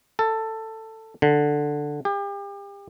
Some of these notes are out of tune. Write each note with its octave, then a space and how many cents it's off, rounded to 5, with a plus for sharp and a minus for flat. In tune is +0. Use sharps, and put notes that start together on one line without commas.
A4 +15
D3 +5
G4 +35